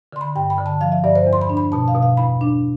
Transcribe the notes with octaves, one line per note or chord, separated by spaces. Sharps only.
D3 C6
B5
G2 G5
B5
D3
A5
F3 F5
E5
G2 D5
C5
E2
C6
B5
D4
B5
B2 A5
F5
B2
F5
E2 B5
D4